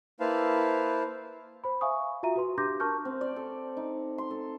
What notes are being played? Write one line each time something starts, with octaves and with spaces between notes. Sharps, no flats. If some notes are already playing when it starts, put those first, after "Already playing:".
A#3 E4 B4 C5 F5 A5
C5 B5
E5 F5 G#5 C#6 D#6
F4 F#4 E5 A#5 D#7
F#4 B4 C6
D4 G4 C6 D6 G6 A#6
D4 A#4 A5 C#6 F6 G6
C4
D5
A4
D#4
C6
A4